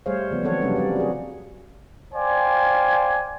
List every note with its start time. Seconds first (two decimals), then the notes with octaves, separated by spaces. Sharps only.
0.06 G3 A3 G#4 C5 C#5 F5
0.31 C#3 F3 B3
0.43 E3 F#3 C4 A4 C#5 F#5
0.61 C3 F#3 G3 A#3 C#4 D4
0.76 G3 C4 D5
0.96 F#4 G#4
2.14 C5 D5 F5 G5 G#5